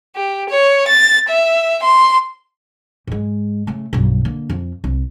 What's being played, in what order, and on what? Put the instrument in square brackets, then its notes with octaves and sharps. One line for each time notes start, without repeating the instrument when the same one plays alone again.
[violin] G4
C#5
A6
E5
C6
[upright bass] G#2 G#3
C#3 A3
B1 G2
D3 A#3
F2
C2